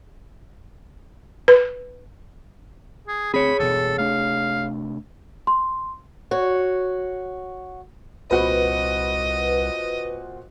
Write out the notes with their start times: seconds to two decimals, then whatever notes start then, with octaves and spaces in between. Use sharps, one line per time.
1.48 B4
3.08 G#4
3.34 D2 F3 C4 G#4 C#5 B5
3.60 E1 G2 B2 A4
3.98 C3 A3 D4 F5
5.47 C6
6.31 F#4 C#5
8.31 C2 A#2 C4 F#4 B4 D#5